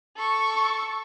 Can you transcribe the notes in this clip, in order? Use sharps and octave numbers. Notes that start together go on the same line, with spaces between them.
A4 C#6